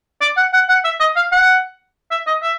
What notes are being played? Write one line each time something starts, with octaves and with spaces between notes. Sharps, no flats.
D5
F#5
F#5
F#5
E5
D#5
F5
F#5
E5
D#5
E5